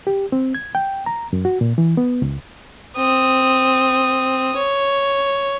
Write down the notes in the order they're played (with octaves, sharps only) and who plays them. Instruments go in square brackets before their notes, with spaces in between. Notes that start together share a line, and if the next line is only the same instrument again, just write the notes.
[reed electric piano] G4
C4
G#6
G5
A#5
F#2
F#4
A#2
E3
B3
C#2
[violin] C4 D#6
C#5